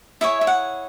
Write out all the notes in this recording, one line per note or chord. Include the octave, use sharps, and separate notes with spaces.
E4 G#4 C#5 E5
E5
F#5